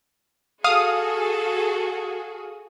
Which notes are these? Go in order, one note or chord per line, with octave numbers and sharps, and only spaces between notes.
F#4 G#4 A4 F5 D#6